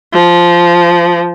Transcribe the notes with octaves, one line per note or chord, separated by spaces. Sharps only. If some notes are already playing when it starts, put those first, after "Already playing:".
F3